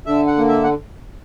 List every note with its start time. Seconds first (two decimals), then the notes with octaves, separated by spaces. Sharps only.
0.06 D3 E5
0.27 F#5
0.38 A#3
0.48 E5
0.64 F#5